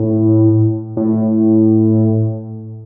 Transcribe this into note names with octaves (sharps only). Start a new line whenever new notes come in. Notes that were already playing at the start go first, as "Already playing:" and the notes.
Already playing: A2
A2